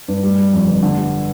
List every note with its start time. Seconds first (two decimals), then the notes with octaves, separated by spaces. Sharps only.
0.08 G2
0.24 G3
0.38 G3
0.53 F2
0.67 G1
0.83 D3
0.97 G3